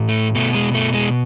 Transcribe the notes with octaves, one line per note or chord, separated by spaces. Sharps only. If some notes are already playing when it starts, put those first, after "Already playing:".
Already playing: A2 E3
A3
B2 A3
G#3
A3
G#3